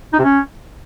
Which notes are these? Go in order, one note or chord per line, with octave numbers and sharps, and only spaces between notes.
D#4
C3
C#4